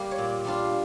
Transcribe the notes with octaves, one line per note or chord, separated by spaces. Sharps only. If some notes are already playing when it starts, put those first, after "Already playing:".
Already playing: G3 A#3
C#5
A#2 D5
G3 D4 F4